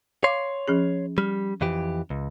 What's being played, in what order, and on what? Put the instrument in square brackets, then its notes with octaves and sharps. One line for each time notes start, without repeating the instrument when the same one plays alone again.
[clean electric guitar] C#5 C6 [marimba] F5 D6
[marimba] F3 C#4 G#4
[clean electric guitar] G3 [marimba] F6
[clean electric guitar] F2 E3 G4
C#2